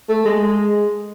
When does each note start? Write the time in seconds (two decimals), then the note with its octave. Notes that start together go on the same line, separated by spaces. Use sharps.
0.09 A3
0.25 G#3